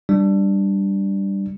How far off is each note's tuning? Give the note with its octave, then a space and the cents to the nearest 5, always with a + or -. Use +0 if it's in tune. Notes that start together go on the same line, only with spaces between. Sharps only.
G3 +0 D4 +5